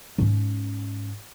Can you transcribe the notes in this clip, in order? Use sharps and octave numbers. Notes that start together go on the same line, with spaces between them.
G#2 C#4